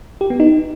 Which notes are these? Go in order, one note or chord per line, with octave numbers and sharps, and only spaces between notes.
G4
B3
D#4